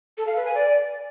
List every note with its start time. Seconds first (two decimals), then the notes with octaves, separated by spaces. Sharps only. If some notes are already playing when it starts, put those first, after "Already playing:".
0.18 A4
0.27 F5
0.36 B4
0.45 G#5
0.55 D5